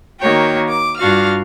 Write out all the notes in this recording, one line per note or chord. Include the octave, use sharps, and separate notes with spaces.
D#3 A#3 F#4 C#5 G5
D6
G2 D4 F4 F#4 F5 F6